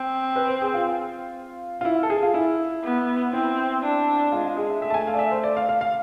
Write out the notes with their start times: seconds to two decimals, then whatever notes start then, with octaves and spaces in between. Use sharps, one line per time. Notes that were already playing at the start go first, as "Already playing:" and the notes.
Already playing: C4
0.36 B4
0.48 C5
0.62 G#4
0.74 F4
1.81 F4
1.85 E4
2.03 A4
2.10 G#4
2.23 F4
2.34 E4
2.84 B3
3.33 C4 E4
3.83 D4
4.32 G#3 F4
4.44 F4
4.57 G#4
4.69 E5
4.82 A3 E5
4.90 A5
4.94 G#5
5.07 F5
5.14 D5
5.19 E5
5.31 C5
5.43 D5
5.57 F5
5.69 F5
5.81 F5